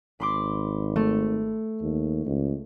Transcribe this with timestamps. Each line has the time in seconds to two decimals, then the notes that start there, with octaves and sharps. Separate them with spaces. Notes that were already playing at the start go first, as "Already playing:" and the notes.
0.20 G#1 B5 C6 D6
0.96 A3
1.81 D#2
2.26 C#2